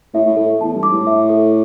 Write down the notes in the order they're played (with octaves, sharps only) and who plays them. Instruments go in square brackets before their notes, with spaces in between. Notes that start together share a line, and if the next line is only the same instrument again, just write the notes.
[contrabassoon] A2 [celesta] E5
[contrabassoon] A2
[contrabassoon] A2 [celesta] A4
[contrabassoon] E2 [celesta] A5
[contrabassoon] G2
[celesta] D6
[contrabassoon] A2
[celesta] E5
A4